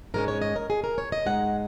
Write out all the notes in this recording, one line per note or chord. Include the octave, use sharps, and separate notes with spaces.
G#2 G#3 C#4 A#4
C#5
D#5
A#4
G#4
A#4
C#5
D#5
G#2 G#3 D#4 F#5